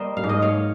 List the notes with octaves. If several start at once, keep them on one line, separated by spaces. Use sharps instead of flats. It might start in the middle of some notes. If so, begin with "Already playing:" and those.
Already playing: G3 A#3 C5 D#5
F5
G#2
D#5
C#5 F5